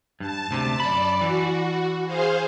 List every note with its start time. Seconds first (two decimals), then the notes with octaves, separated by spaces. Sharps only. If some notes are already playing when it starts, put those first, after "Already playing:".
0.20 G2 A5
0.51 D2 C3
0.80 F#2 D5 B5
1.21 E3 F#4
2.05 G#4 C5 F5